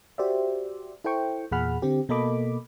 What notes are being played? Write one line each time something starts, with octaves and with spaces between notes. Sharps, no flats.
F#4 G4 C5 D5 E5
E4 A4 C5 G5 C#6
E2 A#2 G#4 F#5 B5 F6
D3 C4 G4
B2 A#3 A4 D#5 B5 D6